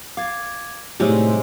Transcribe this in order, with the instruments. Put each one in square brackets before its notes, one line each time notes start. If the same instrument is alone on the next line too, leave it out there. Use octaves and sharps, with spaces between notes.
[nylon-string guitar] F5 [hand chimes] D6 G#6 A6
[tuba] A2 [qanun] C3 G#3 D#4 [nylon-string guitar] G3 [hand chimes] C4 C#5 E6